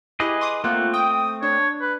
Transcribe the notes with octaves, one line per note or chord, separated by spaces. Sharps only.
E4 G4 G#4 B4 D#5
C6 D6 D#6
A3 A#3 C4 F4 F#5
G5 D#6
D4 C#5
B4